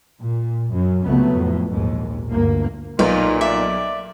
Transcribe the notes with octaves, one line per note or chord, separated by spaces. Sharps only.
A#2
F#2
C#2 C3 F#3 A3 B3
F2 A2
A#1 D#2 G#2
G1 D2 A#3
B1 A#2 D#4 F4
D5 E5